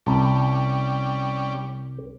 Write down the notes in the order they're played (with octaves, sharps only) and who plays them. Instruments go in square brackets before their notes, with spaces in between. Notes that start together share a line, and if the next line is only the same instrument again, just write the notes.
[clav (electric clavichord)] C2 A5 [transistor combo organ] G3 C#4 D5